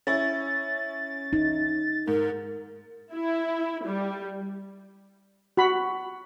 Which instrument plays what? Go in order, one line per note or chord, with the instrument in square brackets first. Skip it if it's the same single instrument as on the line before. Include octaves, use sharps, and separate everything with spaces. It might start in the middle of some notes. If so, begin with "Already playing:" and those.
[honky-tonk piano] C#4 E4 [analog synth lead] A6
[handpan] D#4
[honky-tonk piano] G#2 [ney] A#4
[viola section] E4
G3
[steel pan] F#4 B5